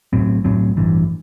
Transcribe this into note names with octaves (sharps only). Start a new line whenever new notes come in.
B1 A2 F#3 C4
B1 A2 F#3 C4
A1 G2 E3